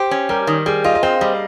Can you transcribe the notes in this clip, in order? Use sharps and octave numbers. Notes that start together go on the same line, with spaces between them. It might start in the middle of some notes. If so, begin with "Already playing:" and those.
Already playing: G4 C5
C#4
G3 A#4
D#3
G3 G#4
F4 D#5
D#5
C4 F5
G3 D#5